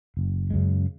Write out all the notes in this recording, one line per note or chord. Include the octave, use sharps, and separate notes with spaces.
F#1
F#2 C#3 G#3